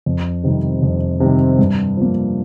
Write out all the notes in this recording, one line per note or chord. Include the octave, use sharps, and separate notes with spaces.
F2
C3 D#3 G3 C4
F2
C3 D#3 G3 C4
G2
F3 A#3